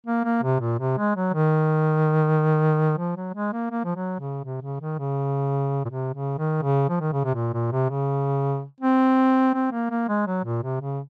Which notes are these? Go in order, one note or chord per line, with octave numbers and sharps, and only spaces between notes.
A#3
A#3
C3
A#2
C3
G#3
F#3
D#3
F3
F#3
G#3
A#3
A#3
F3
F#3
C#3
C3
C#3
D#3
C#3
A#2
C3
C#3
D#3
C#3
F3
D#3
C#3
C3
A#2
A#2
C3
C#3
C4
C4
A#3
A#3
G#3
F#3
A#2
C3
C#3